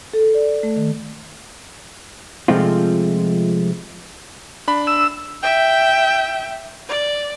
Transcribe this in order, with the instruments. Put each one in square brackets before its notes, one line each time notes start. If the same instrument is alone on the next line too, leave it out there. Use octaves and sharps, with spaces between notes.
[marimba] A4
D5
A3
D#3
[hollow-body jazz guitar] C3 F3 G#3 A3 C4 F4
[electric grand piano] D4 B5
[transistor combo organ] E6
[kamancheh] E5 G5
D5